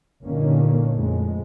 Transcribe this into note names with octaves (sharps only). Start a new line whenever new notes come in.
G1 A#2 D3 D#3 A#3 C#4
F2 A2 G#3